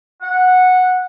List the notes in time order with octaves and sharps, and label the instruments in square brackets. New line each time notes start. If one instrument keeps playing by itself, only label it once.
[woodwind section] F#5